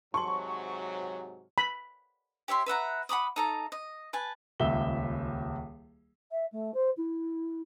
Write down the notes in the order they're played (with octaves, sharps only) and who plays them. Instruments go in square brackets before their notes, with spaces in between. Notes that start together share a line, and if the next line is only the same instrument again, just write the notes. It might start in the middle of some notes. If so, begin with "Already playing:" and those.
[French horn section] G#2 C3 F#3 [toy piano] A5 C6 [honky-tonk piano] C#6
[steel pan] B5
[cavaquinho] G4 C#5 E5 C6
B4 E5 F#5 A#5
F#5 B5 D6 D#6
D#4 A4 A#5
D#5
B4 G#5 A5
[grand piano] D#1 C#2 E5 G7
[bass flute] E5
A3
C5
E4